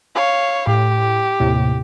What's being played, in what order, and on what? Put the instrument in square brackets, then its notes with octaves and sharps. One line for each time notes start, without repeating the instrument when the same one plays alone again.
[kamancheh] C#5 F5
[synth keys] A2 [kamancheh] G4
[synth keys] D#2 A2 C3